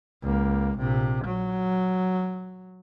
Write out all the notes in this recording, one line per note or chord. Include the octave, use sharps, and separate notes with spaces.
C#2 A#3
A#1 C3
F#3